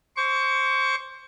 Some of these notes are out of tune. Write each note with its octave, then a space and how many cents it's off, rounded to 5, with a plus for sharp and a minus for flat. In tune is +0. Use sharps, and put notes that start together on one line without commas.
C5 +15 C#6 +30